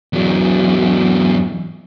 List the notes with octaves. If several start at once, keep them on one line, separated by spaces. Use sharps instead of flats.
E2 F#3